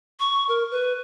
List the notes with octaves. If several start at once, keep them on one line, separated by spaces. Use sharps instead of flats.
C#6
A#4
B4